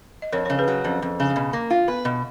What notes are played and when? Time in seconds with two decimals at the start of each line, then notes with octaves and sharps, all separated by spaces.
0.22 D#5
0.32 F2 A#4 C#5
0.45 C#3 A#4 C#5
0.58 G#4 B4
0.68 F#3
0.84 F2 C#4
1.02 F2
1.20 C#3
1.36 B2
1.53 A#3
1.70 F4
1.88 B3 B4
2.05 B2